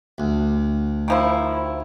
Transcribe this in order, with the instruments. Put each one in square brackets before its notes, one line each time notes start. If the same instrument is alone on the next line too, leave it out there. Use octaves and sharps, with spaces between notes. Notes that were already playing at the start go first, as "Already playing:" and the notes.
[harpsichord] D2
[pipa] D#3 F3 E4